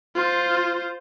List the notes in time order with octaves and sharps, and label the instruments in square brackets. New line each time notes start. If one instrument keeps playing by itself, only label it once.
[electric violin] F4 C5